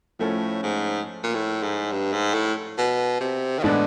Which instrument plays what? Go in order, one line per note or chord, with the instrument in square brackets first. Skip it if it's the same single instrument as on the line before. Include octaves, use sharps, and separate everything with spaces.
[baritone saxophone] A2 [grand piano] F3 A3 C#4
[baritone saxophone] G#2
A#2
A2
G#2
G2
G#2
A2
B2
C3
D#3
[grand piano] A2 E3 G#3 B3 D4 [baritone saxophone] D3